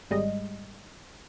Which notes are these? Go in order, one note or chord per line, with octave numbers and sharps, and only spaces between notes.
G#1 G3 G#3 D#5